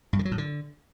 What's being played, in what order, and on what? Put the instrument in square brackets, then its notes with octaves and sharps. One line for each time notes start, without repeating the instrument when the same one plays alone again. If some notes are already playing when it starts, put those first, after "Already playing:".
[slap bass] G2
D3
F#3
A2
D3